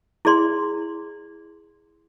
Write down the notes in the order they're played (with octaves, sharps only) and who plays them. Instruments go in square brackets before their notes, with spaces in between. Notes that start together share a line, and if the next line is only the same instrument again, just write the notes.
[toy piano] E4 G#4 D5 C6